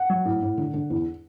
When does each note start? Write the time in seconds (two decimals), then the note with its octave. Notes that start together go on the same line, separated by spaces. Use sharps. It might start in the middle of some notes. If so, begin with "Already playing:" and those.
Already playing: F#5
0.09 F#3
0.25 A2
0.42 A2
0.58 D3
0.74 D3
0.90 E2